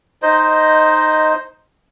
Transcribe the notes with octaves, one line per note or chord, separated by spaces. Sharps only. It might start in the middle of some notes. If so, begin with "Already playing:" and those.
D#4 C5 D#5